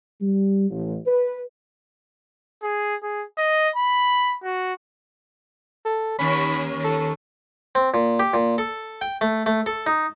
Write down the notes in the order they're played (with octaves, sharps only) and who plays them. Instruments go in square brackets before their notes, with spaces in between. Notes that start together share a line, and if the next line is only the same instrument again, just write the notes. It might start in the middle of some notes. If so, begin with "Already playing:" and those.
[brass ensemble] G3
A1
B4
[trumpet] G#4
G#4
D#5
B5
F#4
[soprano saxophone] A4
[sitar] D#2 C#4 [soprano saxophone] B5
[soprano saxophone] A4
[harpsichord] C4
A#2
G4
A#2
A4
G5
A3
A3
A4
D#4